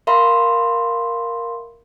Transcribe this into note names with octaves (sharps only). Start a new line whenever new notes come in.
A#4 E5 F5 B5 C6